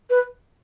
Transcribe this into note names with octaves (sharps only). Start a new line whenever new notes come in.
B4